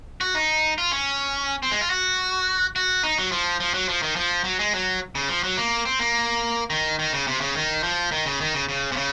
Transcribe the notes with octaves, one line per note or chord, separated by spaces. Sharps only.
F#4
D#4
F4
C#4
C4
G#3
F4
F#4
F#4
D#4
F#3
F3
F3
F#3
F3
D#3
F3
F#3
G#3
F#3
C#3
F3
F#3
A#3
C4
A#3
D#3
D#3
C#3
C3
C#3
D#3
F3
D#3
C#3
D#3
C#3
C#3
C3
C#3